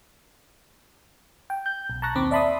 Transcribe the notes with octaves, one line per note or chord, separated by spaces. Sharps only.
G5
G6
B1
A5 A#5 C#6 F#6 A#6
D#2 D#3 C4 B5 D6
D5 E5 A5 B5 C6 D#6